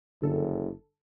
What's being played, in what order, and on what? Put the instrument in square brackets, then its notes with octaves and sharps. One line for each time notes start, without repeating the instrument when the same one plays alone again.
[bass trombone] F#1 [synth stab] G2 D3 A4